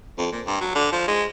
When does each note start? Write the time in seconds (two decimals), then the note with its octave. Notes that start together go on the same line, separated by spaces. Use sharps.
0.18 F2
0.32 A#2
0.47 G2
0.61 F#3
0.75 D3
0.92 F3
1.08 G#3